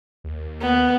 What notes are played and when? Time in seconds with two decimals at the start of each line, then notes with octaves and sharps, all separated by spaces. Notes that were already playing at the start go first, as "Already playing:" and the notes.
0.24 D#2
0.62 B3